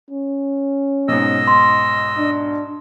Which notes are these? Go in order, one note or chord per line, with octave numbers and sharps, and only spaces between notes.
C#4
B1 G#2 D#5 E6
C6
D4